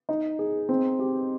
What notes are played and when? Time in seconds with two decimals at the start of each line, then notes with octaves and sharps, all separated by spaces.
0.09 D#4
0.39 G#4
0.69 C4
0.99 G4